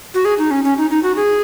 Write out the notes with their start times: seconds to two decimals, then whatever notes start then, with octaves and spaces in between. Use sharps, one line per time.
0.14 F#4
0.25 G#4
0.39 D#4
0.51 C#4
0.64 C#4
0.78 D#4
0.90 D#4
1.03 F#4
1.16 G#4